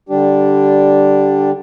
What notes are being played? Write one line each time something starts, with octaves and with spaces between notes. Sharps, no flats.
D3 G3 D4 G4